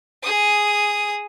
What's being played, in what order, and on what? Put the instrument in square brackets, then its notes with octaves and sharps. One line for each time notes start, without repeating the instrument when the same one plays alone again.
[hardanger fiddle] G#4 D#6